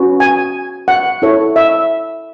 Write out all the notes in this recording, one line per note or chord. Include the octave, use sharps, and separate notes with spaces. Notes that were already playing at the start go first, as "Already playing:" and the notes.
Already playing: C#4 F#4 B4
G#5
F#5
E4 A4 C#5
E5